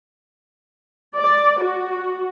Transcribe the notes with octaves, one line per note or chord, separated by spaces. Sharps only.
D5
F#4